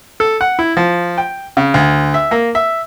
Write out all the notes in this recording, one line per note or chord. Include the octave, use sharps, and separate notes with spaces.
A4
F#5
E4
F3
G5
C#3
D2
E5
A#3
E5